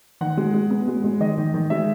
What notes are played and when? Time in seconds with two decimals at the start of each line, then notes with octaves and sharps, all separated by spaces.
0.21 D#3 F#5
0.37 G#3
0.54 G#3
0.70 B3
0.88 G#3
1.04 G#3
1.20 D#3 D#5
1.37 D#3
1.54 D#3
1.70 G#3 E5